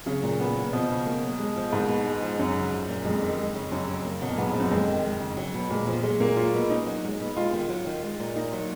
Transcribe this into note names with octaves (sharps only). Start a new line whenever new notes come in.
C#3 F#3
A#2
B3
F#3
B2 F3
C#3
A#3
F#3
G#3
F3
G#2 A#3
B2
G#3
F3
F#2 F#3
C#3
F3
A#2
F2 G#3
D#3
G#3
C#3
F#2 F#3
C#3
A#3
B2 F#3
A#2
G#2 B3
G#2
F3
F#2
F2 G#3
D#3
G#3
C#3
F#3
B2
A#2 G#3
F3
F#3 G#3
A#2 A#3
F#3 F4
B2
C#4 D#4
F#3
G#3
B2
G#3 F4
D#3
F#3
D#3
G#3
A#2
A#3 D#4
F#3